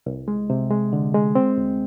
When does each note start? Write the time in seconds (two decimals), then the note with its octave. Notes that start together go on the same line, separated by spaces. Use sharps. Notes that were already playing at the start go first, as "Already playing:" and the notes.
0.06 C2
0.28 G#3
0.50 C3
0.71 G#3
0.93 D3
1.14 G#3
1.35 C4
1.57 D2